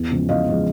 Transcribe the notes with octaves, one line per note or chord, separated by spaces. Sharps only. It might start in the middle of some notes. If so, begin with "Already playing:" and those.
Already playing: E2
C#3 F3 G#3
E2 D#5 F5
C#3 F3 G#3